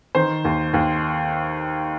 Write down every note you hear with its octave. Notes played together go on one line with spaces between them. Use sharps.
D#3 C5
D#2
D#2